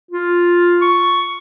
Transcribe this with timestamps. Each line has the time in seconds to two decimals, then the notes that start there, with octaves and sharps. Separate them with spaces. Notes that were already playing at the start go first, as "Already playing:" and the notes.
0.11 F4
0.82 C#6